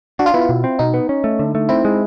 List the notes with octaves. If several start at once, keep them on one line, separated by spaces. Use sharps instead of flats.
D4 F#4
F4
B3 E4
F4
B2
C4
B2 D#4
B3
C#4
A3
D3
A3
C4 E4
G#3